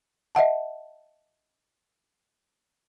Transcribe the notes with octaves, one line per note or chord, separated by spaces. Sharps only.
D#5 E5 F#5 A5